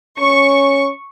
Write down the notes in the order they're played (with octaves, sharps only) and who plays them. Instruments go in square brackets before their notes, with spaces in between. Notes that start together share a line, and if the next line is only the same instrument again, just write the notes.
[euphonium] C#4 [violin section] C#6